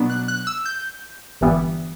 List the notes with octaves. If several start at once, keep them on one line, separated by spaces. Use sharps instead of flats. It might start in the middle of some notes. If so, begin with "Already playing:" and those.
Already playing: B2 F#3 B3 D4
F#6
F#6
E6
G6
G1 G2 E3 G3 B3